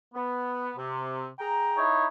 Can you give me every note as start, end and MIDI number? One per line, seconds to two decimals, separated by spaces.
0.14 0.71 59
0.77 1.27 48
1.39 1.82 68
1.39 1.82 79
1.39 1.82 82
1.78 2.06 63
1.78 2.06 64
1.78 2.06 73